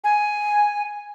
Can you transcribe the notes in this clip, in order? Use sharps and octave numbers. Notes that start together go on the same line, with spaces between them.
G#5